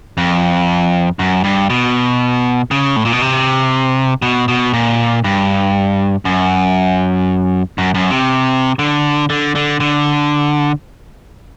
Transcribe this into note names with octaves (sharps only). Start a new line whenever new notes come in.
F2
F#2
G2
B2
C#3
A2
A#2
B2
C3
B2
B2
A#2
G2
F#2
F#2
F#2
C3
D3
D3
D3
D3